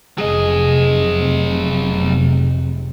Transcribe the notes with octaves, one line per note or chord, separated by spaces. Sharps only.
F1 C3 F#3 G#4 D#5